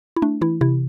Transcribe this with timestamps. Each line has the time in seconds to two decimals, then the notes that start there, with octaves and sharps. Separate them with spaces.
0.16 E4
0.22 A3 D4
0.41 E3 E4
0.61 C3 E4